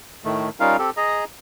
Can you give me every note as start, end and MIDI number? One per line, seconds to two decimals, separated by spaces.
0.25 0.49 45
0.25 0.49 51
0.25 0.49 57
0.60 0.77 55
0.60 0.77 61
0.60 0.77 63
0.60 0.77 65
0.60 0.77 70
0.60 0.77 77
0.79 0.90 60
0.79 0.90 67
0.79 0.90 69
0.97 1.24 68
0.97 1.24 75
0.97 1.24 82